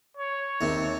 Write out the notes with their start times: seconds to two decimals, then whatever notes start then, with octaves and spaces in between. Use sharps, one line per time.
0.17 C#5
0.61 D#2 C3